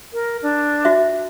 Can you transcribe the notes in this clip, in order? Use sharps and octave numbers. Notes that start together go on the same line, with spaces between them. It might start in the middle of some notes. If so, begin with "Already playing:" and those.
A#4
D4
F#4 E5